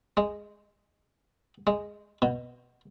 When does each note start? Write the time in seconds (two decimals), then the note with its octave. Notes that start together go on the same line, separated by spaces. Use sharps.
0.17 G#3
1.67 G#3
2.22 B2